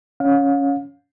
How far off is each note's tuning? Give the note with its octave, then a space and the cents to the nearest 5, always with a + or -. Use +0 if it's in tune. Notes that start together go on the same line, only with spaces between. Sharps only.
C#4 +5 F5 +35